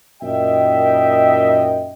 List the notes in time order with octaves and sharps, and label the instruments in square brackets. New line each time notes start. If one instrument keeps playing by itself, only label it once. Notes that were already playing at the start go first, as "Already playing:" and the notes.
[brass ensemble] F#2 A#2 D#4 D#5 E5 G5